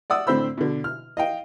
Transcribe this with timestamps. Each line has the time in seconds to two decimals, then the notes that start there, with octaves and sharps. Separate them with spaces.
0.10 D5 F#5 D#6 E6
0.27 A2 D3 C4 C5 B5 E6
0.57 B2 D3
0.84 F6
1.17 D#5 F5 G5